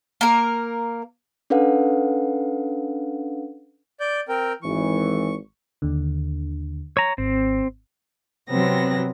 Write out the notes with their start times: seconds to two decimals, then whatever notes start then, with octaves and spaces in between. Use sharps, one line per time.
0.21 A#3 A#4
1.50 C#4 D4 A4 B4 F5 F#5
4.00 D5 G6
4.29 C4 A#4 G5
4.63 G#1 E3 C#6
5.82 D#2 D3
6.97 C#5 A#5
7.18 G#1 C4
8.49 C3 F#3 B3 C4 A#6